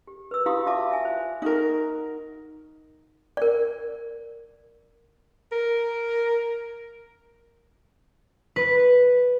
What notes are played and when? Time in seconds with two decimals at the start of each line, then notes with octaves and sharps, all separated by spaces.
0.07 G4
0.31 B4 E6
0.46 E4 F#4 G4 F5 B5 D#6
0.67 F4 D5 E5 F5 A5 D6
0.91 E5 G#5
1.05 C5
1.42 D#4 F#4 A#4
3.37 A#4 D5
5.52 A#4
8.56 B4